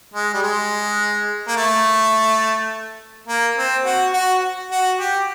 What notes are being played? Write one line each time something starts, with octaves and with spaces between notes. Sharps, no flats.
G#3
G3
G#3
A#3
A3
A#3
C4
F#4
F#4
F#4
G4